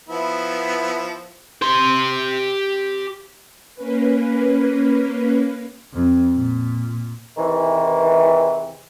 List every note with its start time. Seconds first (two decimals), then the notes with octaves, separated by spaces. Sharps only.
0.09 F3 B3 E4
1.62 G4 C6
3.75 A#3 C#4 B4
5.94 F2
6.35 A#2
7.38 E2 C3 D#3 E3